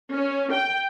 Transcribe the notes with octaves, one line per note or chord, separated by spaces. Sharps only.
C#4
G5